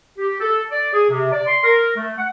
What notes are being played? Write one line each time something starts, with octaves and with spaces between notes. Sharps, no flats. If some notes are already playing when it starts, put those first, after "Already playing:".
G4
A4
D5
G#4
C3
D5
C6
A#4
A3
F#5